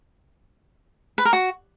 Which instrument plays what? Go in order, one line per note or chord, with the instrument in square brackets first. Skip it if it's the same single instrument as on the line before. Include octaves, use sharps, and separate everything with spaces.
[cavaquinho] B4
A#4
F#4